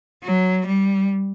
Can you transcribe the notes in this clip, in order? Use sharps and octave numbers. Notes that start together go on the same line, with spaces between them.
F#3
G3